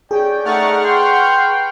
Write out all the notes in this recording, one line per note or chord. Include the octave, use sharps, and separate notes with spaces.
C#4 G#4 D5 G5
A3 D#4 D5 F#5 C#6 F6
B4 G5 C6